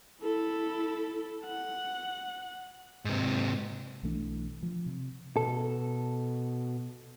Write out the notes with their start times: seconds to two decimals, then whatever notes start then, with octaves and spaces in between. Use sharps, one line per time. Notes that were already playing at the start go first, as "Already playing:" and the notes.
0.21 E4 A4
1.45 F#5
3.05 G#2 C3
4.03 B1 E3 A3 D4
4.63 F3
4.86 C3
5.37 B2 A4